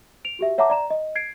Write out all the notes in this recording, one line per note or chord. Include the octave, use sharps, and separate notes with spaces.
D7 F7
F#4 G4 E5
C#5 E5 F#5 A5 A#5 D6
D5 A#5 E7
D#5
G#6 C7 D7